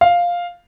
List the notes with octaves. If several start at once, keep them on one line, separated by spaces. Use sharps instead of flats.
F5